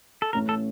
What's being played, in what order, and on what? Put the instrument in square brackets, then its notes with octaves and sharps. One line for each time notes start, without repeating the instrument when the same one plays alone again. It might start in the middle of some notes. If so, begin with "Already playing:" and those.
[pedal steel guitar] A4
[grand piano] A1 A2 A3 C#4 [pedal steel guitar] A#4
[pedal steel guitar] A4